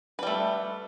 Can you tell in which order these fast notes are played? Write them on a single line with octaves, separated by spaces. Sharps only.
B4 G3 A3